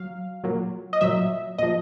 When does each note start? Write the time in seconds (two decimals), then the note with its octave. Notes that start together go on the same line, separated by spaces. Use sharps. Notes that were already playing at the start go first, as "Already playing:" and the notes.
Already playing: F#3 F5
0.44 A#2 F#3
0.93 D#5
1.01 A#2 F#3 E5
1.58 A#2 F3 D#5